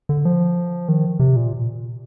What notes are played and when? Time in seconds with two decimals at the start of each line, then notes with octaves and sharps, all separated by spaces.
0.09 D3
0.25 F3
0.88 D#3
1.20 C3
1.36 A#2